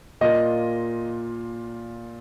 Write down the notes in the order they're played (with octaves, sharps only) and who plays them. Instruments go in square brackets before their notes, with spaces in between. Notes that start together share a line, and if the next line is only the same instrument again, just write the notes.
[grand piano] A#2 A#3 F4 [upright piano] D#5